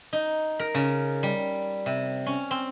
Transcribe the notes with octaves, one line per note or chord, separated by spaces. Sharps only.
D#4
A#4
C#3
G3
C3
C#4
C4